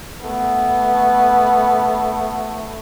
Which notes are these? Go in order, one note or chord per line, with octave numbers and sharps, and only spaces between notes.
A3 B3